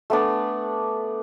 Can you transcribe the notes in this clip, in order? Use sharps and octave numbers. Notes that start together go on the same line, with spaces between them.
A3 B3 D4